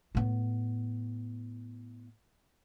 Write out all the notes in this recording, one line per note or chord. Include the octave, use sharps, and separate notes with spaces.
A2 B3